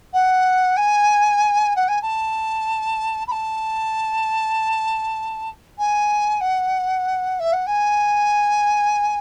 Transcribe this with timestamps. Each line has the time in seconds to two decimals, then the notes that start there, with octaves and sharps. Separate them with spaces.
0.13 F#5
0.77 G#5
1.76 F#5
1.88 G#5
2.02 A5
3.27 B5
3.32 A5
5.78 G#5
6.40 F#5
7.39 E5
7.53 F#5
7.66 G#5